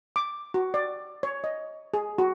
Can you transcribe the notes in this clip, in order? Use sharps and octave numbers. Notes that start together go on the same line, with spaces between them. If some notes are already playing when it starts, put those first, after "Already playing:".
D6
F#4
D5
C#5
D#5
G#4
F#4